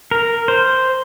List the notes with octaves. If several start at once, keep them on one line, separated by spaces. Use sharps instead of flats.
A#4
C5